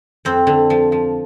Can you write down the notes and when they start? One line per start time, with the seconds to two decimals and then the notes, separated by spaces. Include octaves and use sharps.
0.25 F2 C4
0.47 D3
0.70 F3
0.92 F3